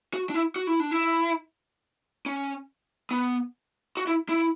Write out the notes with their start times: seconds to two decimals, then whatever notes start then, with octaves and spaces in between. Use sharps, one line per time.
0.14 F#4
0.30 D4
0.34 E4
0.56 F#4
0.67 E4
0.80 D4
0.91 E4
2.26 C#4
3.11 B3
3.97 F#4
4.07 E4
4.29 E4